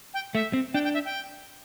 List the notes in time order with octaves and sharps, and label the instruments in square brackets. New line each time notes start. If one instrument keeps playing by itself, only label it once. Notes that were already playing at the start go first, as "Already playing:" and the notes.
[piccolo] G5
[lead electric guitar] A3 [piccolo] E5
[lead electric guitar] C4
[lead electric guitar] D4 [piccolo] G5
[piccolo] G5
E5
G5